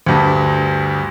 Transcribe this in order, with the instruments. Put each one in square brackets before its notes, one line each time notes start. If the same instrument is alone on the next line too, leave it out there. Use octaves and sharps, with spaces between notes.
[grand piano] D2 G2